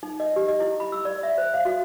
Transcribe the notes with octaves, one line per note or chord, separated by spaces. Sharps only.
D#4
D#5
G4
D#5
E4
B5
E6
D5
E5
C5
F5
F#4